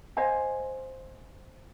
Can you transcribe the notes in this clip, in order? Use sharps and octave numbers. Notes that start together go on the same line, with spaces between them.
C5 D#5 F5 G#5